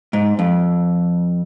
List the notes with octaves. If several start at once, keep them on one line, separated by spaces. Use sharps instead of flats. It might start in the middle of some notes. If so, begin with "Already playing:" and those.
G#2
F2